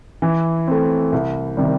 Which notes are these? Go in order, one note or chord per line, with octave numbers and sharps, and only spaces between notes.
E3
A3 C4
C2
C3 D#3 G3